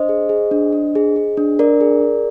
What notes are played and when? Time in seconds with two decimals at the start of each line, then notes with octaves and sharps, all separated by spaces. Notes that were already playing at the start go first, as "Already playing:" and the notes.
Already playing: D4 C5 D#5
0.09 G#4
0.29 G#4
0.51 D4
0.73 D4
0.95 G#4
1.16 G#4
1.37 D4
1.59 D4 A#4 D5
1.81 G#4
2.02 G#4